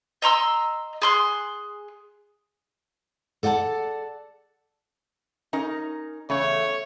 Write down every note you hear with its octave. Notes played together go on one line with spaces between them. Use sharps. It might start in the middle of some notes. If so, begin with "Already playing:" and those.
D#5 A#5 C6 E6
G#4 C6 F#6
A4 D5 F#5 G5 A5
C#4 D#4 A#4
E2 C#3 A3 C#5